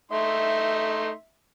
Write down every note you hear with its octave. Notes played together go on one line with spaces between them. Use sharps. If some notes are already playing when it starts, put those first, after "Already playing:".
A3 D#4 E5 C6